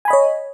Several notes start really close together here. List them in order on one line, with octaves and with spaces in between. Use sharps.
G#5 B5 D#5 C#5